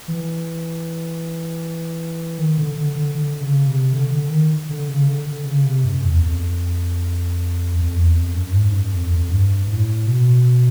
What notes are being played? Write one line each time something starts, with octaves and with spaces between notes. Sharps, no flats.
E3
D#3
D3
D3
D3
D3
C#3
C3
D3
D3
D#3
D3
C#3
D3
D3
C#3
C3
F#2
E2
F2
F2
E2
F2
F#2
G#2
F#2
F2
F2
G2
A2
B2